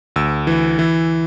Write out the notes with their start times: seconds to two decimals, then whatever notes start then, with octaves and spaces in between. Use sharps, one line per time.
0.16 D2 E6
0.47 E3
0.79 E3